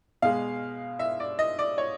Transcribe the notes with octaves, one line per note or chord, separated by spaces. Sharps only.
B2 G#3 F5
E5
D5
D#5
D5
C#5